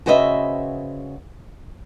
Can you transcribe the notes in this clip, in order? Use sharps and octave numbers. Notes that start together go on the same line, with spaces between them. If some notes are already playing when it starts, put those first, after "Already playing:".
C#3 F#4 B4 C5 D#5 E5